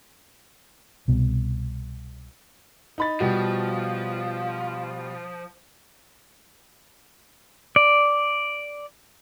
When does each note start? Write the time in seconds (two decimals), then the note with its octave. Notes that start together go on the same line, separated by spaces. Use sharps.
1.08 C2 B2
2.98 D#4 B5 A6
3.20 B2 F3 G3 F#4
7.76 D5